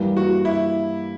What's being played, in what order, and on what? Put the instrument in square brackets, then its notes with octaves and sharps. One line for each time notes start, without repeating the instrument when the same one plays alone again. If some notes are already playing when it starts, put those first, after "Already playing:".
Already playing: [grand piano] G2 E3 G3 A#3
[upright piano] F#4
E4